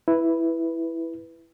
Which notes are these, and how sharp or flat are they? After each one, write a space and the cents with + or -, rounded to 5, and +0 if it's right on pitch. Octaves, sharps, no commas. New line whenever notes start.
E4 +0 B4 +0